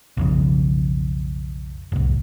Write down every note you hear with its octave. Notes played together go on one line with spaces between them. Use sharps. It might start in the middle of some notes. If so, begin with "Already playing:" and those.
B1 F2 C#3
F1 C2